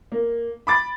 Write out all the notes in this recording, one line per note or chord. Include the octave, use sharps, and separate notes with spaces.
A#3
B5 D6 A6